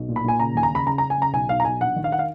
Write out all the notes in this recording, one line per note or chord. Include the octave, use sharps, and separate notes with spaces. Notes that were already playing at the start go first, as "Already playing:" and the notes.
Already playing: B1
A#2
B5
A#2 G#5
C#3 A#5
D#2 G#5
A#5
C#3 B5
C#3 A#5
A#5
C#3
G#5
C#3 A#5
B1 G#5
B1 F5
A#5
B1 G#5
A#1 F#5
D#3
F5
F#5
F5